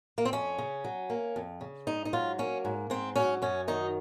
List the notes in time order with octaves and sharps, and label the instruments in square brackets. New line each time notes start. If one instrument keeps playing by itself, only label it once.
[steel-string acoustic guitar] A#3
C4
F2 C#4
C#3
F#3
A#3
F2
C#3
G#2 D#4
D#4
F#3 F4
A#3 C#4
G#2
G#2 C4
F#3 C#4
F#2 C#4
D#3 D#4